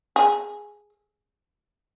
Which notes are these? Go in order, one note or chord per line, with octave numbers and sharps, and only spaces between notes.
G#4